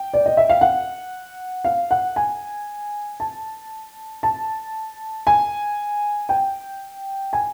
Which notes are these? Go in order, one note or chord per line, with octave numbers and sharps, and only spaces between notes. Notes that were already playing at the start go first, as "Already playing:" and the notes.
Already playing: G5
D5
D#5
E5
F5
F#5
F5
F#5
G#5
A5
A5
G#5
G5
G#5